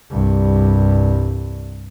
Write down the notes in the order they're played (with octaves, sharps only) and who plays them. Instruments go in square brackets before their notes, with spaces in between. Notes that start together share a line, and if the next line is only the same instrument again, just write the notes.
[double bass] C2 G2